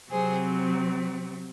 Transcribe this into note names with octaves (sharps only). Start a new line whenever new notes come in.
C3 F#3 C4 G#4 C5